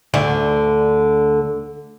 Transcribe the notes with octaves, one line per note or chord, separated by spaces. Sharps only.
D2 D3 A3